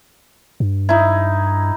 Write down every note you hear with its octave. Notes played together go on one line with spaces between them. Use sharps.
G2
D#4 E4